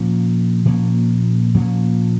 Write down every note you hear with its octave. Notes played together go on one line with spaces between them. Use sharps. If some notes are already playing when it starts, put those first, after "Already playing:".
Already playing: A#2 F3 A#3 C#4
A#2 F3 A#3 C#4
A#2 F3 A#3 C#4